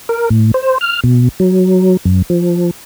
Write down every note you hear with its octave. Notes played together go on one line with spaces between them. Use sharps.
A#4
A2
C5
F6
B2
F#3
F#2
F3